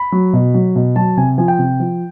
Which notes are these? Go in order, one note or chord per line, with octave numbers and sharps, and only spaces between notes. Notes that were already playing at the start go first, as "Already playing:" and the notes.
Already playing: B5
F#3
B2
F#3
B2
F#3 A5
C3 G#5
F3 G#5
G5
C3
F3